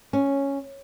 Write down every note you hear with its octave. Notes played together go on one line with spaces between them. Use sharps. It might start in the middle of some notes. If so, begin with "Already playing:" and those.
C#4